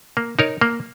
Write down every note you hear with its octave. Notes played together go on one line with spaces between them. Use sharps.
A#3
D#4 A#4 C#5
A#3